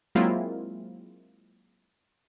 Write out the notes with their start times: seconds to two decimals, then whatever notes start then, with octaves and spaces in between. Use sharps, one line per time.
0.15 F#3 G#3 A#3 C4 E4 F4